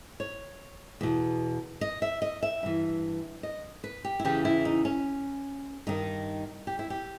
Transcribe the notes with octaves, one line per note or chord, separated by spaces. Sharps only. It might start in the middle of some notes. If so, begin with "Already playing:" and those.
C#5
E2 B2
D#5
E5
D#5
E5
G2 E3
D#5
B4
G4
E4
E2 C#3 E3 G4
E4
D#4
C#4
G2 D#3 D#4
G4
E4
G4